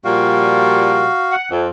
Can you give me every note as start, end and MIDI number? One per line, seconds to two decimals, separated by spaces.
0.05 1.07 46
0.05 1.07 53
0.05 1.07 55
0.05 1.36 66
0.05 1.36 77
1.31 1.46 78
1.51 1.67 41